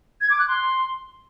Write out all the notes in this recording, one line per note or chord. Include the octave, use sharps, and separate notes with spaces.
G#6
D6
F#6
C6